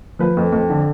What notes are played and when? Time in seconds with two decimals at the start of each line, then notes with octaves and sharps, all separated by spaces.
0.19 F3 B4
0.37 F2
0.52 F2
0.69 D3